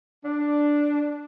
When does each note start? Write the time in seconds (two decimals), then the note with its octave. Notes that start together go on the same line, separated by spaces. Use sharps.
0.24 D4